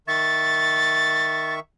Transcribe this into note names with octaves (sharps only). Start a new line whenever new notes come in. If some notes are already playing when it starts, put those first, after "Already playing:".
D#3 E5 C#6 A6